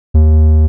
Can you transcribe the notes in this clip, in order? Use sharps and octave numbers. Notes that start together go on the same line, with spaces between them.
D#2